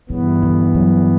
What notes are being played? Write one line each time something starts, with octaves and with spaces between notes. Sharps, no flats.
G2 C#3 E3 B3
D3
F#3